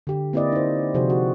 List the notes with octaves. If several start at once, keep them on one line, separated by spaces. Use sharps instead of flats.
D3 G4
A#3 C4 E4 B4 D5 D#5
D#4 C5
C3 F3 F#4 G#4 C5
F#4